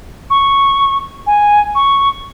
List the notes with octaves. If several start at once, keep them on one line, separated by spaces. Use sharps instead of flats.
C#6
G#5
C#6